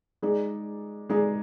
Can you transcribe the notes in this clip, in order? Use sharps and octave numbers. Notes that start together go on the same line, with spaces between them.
G#3 D#4 G#4 D5
G#3 D#4 G#4 D5